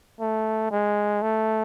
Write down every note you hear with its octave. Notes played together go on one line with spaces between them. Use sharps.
A3
G#3
A3